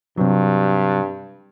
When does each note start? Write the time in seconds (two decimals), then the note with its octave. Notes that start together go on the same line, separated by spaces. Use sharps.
0.18 G2 C3 F#3